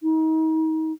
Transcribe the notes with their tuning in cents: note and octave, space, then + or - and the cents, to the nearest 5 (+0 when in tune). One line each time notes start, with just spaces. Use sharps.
D#4 +35